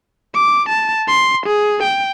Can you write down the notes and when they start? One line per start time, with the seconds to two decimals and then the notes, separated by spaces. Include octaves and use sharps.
0.35 D6
0.69 A5
1.08 C6
1.46 G#4
1.83 G5